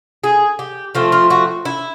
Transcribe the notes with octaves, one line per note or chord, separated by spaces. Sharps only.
G#4
G4
F3 A3 C4 F4
F4
F#4
E4